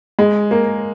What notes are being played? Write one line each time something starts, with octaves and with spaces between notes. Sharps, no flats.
G#3
A#3